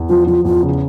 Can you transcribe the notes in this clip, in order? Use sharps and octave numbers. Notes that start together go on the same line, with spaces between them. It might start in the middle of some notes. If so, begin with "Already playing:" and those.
Already playing: E2
F3 F4
F3 F4
E2 F4
C#3